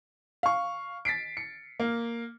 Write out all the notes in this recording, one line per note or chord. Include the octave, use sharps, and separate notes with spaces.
F5 C#6
A6 B6 C7 D7
C#7
A#3